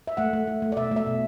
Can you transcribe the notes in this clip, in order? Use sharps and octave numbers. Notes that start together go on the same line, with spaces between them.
E5
A3 F#5
A3
A3
A3
D5
B2 E5
A3 E5
B2